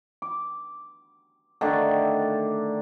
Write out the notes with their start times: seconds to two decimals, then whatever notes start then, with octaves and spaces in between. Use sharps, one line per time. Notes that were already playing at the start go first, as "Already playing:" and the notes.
0.22 D6
1.61 D3 D#3 A3 D4